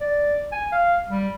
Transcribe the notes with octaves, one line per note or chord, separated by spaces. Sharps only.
D5
G#5
F5
G3